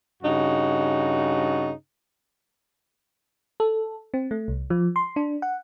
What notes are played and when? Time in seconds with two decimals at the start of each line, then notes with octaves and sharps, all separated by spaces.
0.23 G2 C#3 D#4 F#4
3.60 A4
4.14 C4
4.31 A3
4.48 C2
4.70 F3
4.96 C6
5.16 D4
5.42 F#5